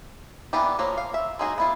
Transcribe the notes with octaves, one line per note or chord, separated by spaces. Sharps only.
E3 A#3 B3 D4 G4
F3 F#3 A#3
F5
E5
G#3 A#3 D#4 F#4 G#4
B3 E4 F4